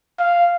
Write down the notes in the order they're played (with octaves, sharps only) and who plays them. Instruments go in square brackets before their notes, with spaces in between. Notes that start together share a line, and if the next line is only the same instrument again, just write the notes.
[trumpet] F5